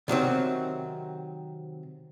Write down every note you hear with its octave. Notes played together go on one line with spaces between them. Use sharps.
C3 D#3 F#3 C4